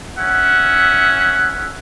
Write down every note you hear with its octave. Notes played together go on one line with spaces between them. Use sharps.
C#4 E5 F#5